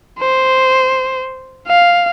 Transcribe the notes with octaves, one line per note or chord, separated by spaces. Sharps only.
C5
F5